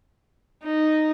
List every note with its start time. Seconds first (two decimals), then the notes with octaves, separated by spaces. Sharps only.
0.63 D#4